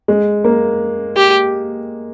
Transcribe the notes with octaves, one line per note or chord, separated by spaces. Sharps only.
G#3
A#3
G4